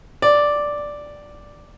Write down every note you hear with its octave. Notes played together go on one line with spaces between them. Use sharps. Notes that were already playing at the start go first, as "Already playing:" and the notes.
D5